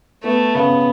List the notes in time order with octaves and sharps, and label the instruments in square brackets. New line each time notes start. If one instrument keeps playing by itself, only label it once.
[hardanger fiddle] A3 [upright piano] B3
[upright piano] C#3 [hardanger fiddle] B3